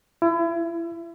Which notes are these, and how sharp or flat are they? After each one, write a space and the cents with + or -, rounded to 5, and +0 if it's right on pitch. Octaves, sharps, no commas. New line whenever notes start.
E4 +35